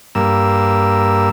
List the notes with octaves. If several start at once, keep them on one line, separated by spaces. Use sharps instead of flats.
G2 A#3 E6